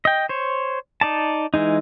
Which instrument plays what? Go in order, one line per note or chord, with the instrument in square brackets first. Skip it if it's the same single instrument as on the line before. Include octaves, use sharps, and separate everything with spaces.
[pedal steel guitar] D#5 G5
C5 C#5
D#4 D5 A5
E3 G#3 D#4